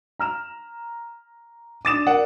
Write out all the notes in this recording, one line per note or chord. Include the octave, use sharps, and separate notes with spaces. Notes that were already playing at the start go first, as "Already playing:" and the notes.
A#5 F6 E7
D4 D6 D#6 A6 D#7 E7
A#4 D5 F#5